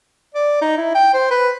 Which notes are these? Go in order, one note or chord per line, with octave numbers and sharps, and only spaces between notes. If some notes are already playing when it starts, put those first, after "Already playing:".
D5
D#4
E4
G5
C5
B4